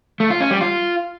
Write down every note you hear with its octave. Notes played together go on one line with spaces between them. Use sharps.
A3
F4
C#4
G3
F4